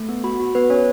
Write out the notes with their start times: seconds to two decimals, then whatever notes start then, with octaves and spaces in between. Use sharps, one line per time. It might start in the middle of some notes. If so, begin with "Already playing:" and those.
Already playing: A3
0.09 B3
0.24 F#4 B5
0.40 F#4
0.55 B3 B4
0.70 C#4 C#5